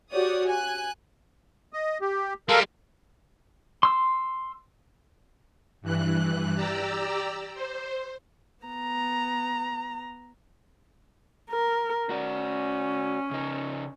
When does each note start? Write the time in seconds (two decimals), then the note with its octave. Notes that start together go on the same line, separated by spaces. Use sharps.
0.12 F#4 G4 C#5 D5 D#6
0.47 G#5 F#6
1.73 D#5
2.01 G4
2.49 G3 G#3 A4 A#4 F5
3.83 C6 E6
5.82 G2 E3 F#6
6.54 G4 D5 A#5 E6
7.54 C5
8.65 B3 A#5
11.50 A#4
12.10 C#4 F#4 D5
13.31 C#3 D#4